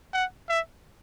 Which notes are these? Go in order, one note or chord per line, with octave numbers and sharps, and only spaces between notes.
F#5
E5